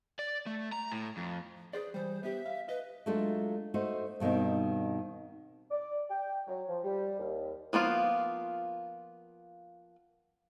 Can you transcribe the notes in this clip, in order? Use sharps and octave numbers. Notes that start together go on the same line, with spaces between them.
D5
A3
A#5
A2
F2
G#4 B4 C5 D5
E3 G3 C5
B3 G4 E5
F5
B4 D#5
F#3 G#3 A3 D4 F4
A3 D#4 F#4 C5
G2 B2 D#3 C4 D#4
D5
G5
F#3
F3
G3
D#2
F3 A#3 B3 F4